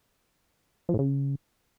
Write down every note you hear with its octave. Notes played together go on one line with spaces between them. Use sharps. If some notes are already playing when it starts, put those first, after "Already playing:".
F3
A2
C#3